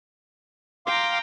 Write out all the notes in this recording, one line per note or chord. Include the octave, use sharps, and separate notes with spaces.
F5 G5 A#5 C6 D6